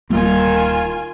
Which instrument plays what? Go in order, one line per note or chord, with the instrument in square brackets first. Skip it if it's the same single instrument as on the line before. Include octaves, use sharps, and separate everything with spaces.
[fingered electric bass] D1 G3 A#3 [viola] D#3 [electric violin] F4 G#5